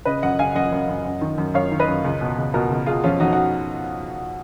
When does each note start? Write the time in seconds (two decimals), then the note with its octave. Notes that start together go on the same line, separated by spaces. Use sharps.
0.05 C#3 B4 D#5
0.22 F#2 D#5 F#5
0.39 C#3 F5 G#5
0.55 F#2 D#5 F#5
0.72 F#2
0.89 F#2
1.05 F#2
1.21 D#3
1.38 F#2
1.54 F#2 C#5 F5
1.72 D#3
1.79 B4 D#5
1.88 F#2
2.04 C#2
2.21 B2
2.38 C#2
2.54 B2 F#4 A#4
2.71 C#2
2.86 B2 F4 G#4
3.04 F2 C#4 F4
3.20 F2 D#4 F#4
3.33 F#4